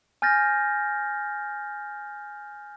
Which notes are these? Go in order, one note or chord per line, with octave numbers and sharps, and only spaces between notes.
G#5 F6 G6 A6 A#6